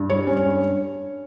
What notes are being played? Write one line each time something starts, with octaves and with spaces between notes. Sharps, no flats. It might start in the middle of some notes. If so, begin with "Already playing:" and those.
Already playing: G2
G3 C#5
C#4
C#5
G2